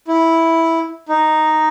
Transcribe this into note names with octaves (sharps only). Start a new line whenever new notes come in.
E4
D#4